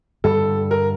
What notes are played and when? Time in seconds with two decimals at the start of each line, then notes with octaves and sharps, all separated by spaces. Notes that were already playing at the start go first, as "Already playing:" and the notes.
0.24 G2 D3 G3 A4
0.71 A#4